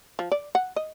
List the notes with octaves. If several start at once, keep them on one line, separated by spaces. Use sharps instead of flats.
F3
D5
F#5
D#5